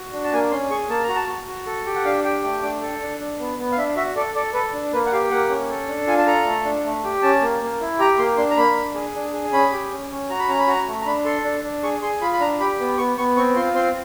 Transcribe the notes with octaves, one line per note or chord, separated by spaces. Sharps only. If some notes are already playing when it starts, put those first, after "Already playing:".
Already playing: F#4
D4
A5
A#3 G#5
C#4 C6
G#4 C#6
A#3 A5
A#5
F#4
A5
F#4
F#4
A4
G4
F#5
D4 F5
G4 G5
A3
D4
A4
D4
D4
B3
B3
F5
D4 E5
F#4 E5
A4 D5
A4 D5
A4 B4
D4
A#3 B4
F#5
G4 F5
A#3 F#5
C#4
A4
D4
F4 G#5
A5
A4 A#5
A3
D4
A3
G4
C#4 A5
A#3
A#3
E4
G4 A#5
A#3 C6
D4 C6
A#5
A#3 B5
D4
G#4
D4
G#4
C#4 B5
G4
C#4
C#4
F#4 A#5
B5
C#4 A#5
B5
F#4 A#5
A3
A#5
D4 B5
A4 C6
D4
D4
G#4 C#6
G#4 C6
F4 B5
B5
D4 A#5
G4 B5
B3
B3 C#6
B3 C#6
C4 C#6
F4 C6
C4 C6